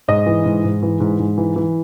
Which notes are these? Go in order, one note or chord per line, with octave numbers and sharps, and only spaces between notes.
G#2 D#5
E3
G#2
G#2
E3
G#2
G#2
E3
E3